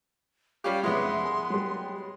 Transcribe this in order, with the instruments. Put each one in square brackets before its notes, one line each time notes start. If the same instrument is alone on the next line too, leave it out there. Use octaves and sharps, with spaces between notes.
[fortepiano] G3 C#4 G4 [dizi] F5
[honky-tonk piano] F2 E4 [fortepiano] G#3 B3 [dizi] C6
[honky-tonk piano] G#4
F#3 G3